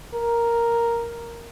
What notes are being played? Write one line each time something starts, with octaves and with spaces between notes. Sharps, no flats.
A#4